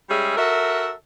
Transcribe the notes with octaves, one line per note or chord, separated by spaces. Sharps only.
G3 G#3 C#4 G#4 E5
F#4 A4 A#4 E5